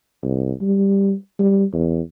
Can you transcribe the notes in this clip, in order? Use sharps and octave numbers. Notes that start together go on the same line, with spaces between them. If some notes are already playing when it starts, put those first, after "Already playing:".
C2
G3
G3
E2